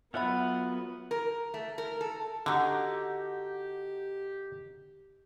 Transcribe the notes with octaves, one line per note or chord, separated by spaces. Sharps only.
F#3 B3 F4 A4 E5 F#5 B5
A#4
A3
A#4
A4
D3 D#4 F#4 G4